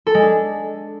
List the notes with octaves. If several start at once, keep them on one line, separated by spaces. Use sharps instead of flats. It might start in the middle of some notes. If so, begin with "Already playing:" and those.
A4
G#3
D4